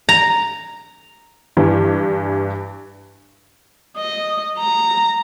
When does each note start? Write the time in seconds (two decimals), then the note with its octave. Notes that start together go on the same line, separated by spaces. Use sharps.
0.09 A#5
1.57 G2 E3
3.98 D#5
4.58 A#5